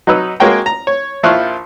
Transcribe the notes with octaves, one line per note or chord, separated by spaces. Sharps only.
F#3 D#4 B4 E6
G#3 A#3 F#4 C#5 G5 A#5
A#5
C#5
A#1 F3 E4 F4 C#6 F#6